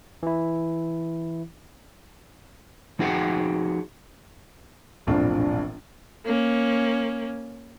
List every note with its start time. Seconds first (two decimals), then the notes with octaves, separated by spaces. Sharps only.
0.23 E3 E4
2.99 F3 D#4 F#4 G#4 F#5 G5
5.07 E1 A#1 A2 C4 D4 F4
6.26 A#3 C#4